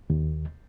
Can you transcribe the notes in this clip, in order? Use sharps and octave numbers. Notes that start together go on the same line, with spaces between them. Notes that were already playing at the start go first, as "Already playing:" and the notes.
D#2